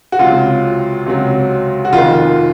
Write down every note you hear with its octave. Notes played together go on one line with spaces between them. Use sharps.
F#4
C#2 C3 F#3 F4
C#2 C3 F#3
F#4
F1 F2 D#3 F4